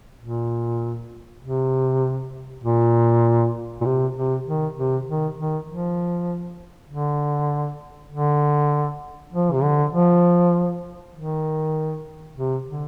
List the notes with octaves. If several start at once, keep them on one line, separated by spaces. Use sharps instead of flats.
A#2
C3
A#2
A#2
C3
C3
D#3
C3
D#3
D#3
F3
D3
D3
F3
C3
D3
F3
D#3
C3
D3